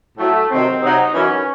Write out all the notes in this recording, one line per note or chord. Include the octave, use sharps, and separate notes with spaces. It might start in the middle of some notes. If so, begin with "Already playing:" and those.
A2 F#3 A3
C3 D#3 F#3 C4
C3 F#3 D#4
F#2 E3 C#4